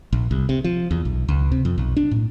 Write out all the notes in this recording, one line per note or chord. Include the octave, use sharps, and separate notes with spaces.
A#1
C2
C3
F3
E2
B1
C#2
C3
F2
B1
D4
A2